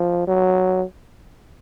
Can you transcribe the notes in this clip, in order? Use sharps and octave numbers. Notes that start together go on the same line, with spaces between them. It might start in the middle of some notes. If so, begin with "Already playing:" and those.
Already playing: F3
F#3